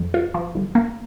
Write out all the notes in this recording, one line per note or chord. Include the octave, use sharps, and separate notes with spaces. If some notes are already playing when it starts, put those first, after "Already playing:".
Already playing: F2
F4
F3
G1
A#3